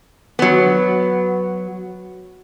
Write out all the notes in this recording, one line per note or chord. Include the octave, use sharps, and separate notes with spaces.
F#3 B3